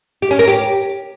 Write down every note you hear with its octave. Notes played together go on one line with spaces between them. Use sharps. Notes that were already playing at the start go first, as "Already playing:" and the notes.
G4
C#4
A#4
G4